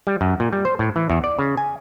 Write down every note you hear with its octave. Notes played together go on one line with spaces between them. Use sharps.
G3
F#2
A#2
G3
C5
A2
E3
E2
D5
C#3
G#5